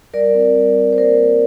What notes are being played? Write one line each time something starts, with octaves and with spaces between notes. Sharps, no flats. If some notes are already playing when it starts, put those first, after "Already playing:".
G3 A#4 D5
C4
G3
C4
C5
A#3 A#4 D5
A#3